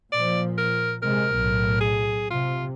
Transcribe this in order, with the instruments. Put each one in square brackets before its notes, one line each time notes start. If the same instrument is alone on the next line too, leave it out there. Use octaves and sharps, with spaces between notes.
[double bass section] A#2 F3 [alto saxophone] D5
[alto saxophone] A#4
[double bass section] C3 G#3 [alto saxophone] A#4
[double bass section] B1 A2
[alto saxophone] G#4
[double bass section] C3 [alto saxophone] F4